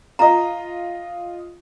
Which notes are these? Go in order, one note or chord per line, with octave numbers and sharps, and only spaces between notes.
F4 D#5 A#5